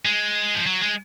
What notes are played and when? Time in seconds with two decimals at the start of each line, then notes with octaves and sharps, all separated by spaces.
0.05 G#3
0.54 F3
0.66 F#3
0.81 G#3